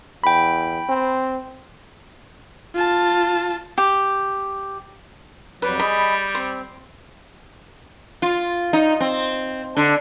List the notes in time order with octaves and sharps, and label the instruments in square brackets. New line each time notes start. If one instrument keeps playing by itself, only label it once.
[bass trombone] E2 [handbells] G5 B5
[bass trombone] C4
[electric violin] F4 A5
[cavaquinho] G4
[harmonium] F2 F#3 [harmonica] G3 [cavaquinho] B4
[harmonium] G#4 D#5 [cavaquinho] B5
[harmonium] C4 [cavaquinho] C6
[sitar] F4
D#4
C4
D3